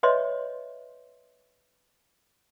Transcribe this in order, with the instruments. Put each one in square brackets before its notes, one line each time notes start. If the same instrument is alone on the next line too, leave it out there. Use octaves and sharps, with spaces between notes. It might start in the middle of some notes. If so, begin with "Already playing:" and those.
[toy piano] B4 C#5 D#5 E5 C6